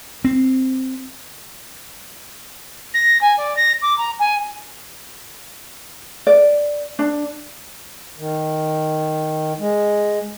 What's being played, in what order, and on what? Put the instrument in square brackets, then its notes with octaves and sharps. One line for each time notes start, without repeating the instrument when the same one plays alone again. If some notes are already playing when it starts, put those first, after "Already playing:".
[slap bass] C4
[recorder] A#6
G#5
D5
A#6
D6
A#5
G#5
[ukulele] D5
D4
[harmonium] D#3
G#3